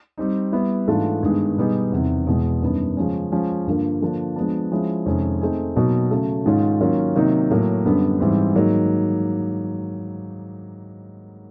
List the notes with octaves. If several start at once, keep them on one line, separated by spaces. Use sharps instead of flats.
G3 C4 D#4
G3 B3 E4
G#2 E3 A3 D4 F4
G2 D#3 G#3 B3
B2 G3 B3 D#4 G#4
E2 C3 D#3
E2 B2 G#3
F#2 D#3 G3 B3 D4
C#3 F3 G#3 C#4
F3 G#3 C#4
G2 D3 F3 A#3
D3 F3 A#3 D4
F3 G#3 B3 D4
F3 G#3 C#4 E4
F2 C3 D#3 G#3 C#4
A3 C4 D#4 G#4
B2 F#3 A#3 D#4 F#4
C#3 F#3 A3
G#2 D#3 G#3 C#4 F4
D#3 F#3 A#3 C#4 F4
C3 D#3 F#3 A#3 D#4
A2 F#3 A#3
F#2 D3 G3 B3 D4
G#2 E3 G3 C4
G#2 D#3 F#3 A#3 D#4